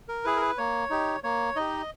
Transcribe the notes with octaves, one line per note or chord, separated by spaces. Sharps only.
A#4
E4 G#4 B4
A#4
B4
A#3 C#5
D#4 G4
A#3 C#5
D#4 G4 D#5